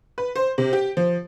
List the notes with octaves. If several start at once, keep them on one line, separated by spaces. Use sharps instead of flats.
B4
C5
C3
G4
F3